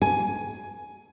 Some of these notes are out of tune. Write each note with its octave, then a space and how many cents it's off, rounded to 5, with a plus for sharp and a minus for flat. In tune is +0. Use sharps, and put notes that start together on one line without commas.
G#5 +10